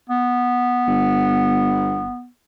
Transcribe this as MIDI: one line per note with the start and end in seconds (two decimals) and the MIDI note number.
0.09 2.27 59
0.87 2.07 31